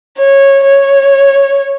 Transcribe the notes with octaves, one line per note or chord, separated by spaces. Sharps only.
C#5
C#5